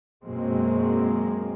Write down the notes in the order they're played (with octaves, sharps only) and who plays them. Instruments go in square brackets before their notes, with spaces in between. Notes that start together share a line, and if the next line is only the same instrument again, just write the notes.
[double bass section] F#2 B2 G#3 A#3 C4